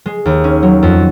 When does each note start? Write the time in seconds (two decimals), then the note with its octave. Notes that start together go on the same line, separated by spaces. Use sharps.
0.06 G#3
0.25 D#2
0.44 C#4
0.63 F#3
0.83 F2